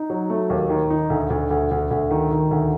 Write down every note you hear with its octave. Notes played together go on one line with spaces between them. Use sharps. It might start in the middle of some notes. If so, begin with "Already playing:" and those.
Already playing: D#4
F#3
A3
D#2
D#3
D#4
D2
D2
D2
D2
D2
D#3
D#3
D2